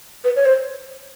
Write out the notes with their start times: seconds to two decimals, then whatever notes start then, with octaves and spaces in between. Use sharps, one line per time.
0.24 B4
0.36 C#5
0.45 C5